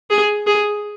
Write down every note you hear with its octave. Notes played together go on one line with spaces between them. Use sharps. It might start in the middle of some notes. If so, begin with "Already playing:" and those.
G#4
G#4